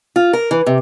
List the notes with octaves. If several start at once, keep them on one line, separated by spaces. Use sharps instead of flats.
F4
A#4
E3
C3